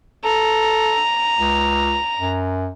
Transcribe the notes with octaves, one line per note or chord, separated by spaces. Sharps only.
A4 A#5
C#2
F#2